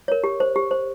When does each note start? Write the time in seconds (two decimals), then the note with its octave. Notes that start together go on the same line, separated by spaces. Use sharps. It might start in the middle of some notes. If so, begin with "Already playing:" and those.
0.08 A#4 C#5
0.24 G4
0.40 C5
0.56 G4
0.71 C5